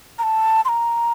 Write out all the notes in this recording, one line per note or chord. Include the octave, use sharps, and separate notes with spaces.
A#5
A5
C6
A#5